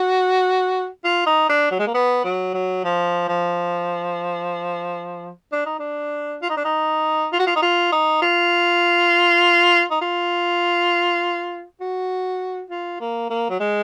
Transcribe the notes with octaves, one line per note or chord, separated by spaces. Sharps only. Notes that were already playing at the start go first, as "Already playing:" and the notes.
Already playing: F#4
F4
D#4
D4
F#3
G#3
A#3
B3
F#3
F#3
F3
F3
D4
D#4
D4
F4
D#4
D4
D#4
F4
F#4
F4
D#4
F4
D#4
F4
D#4
F4
F#4
F4
A#3
A#3
F#3
G#3